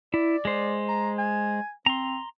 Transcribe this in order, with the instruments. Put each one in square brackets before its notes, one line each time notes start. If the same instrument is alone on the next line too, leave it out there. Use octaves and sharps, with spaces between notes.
[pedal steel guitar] E4 [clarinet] D5
[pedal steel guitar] G#3 C5
[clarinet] A#5
G#5
[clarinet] C4 [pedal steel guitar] A#5 C6